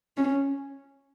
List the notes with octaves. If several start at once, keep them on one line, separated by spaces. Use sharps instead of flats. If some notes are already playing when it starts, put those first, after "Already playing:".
C#4